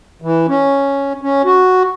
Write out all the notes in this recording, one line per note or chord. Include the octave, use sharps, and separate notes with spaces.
E3
C#4
C#4
F#4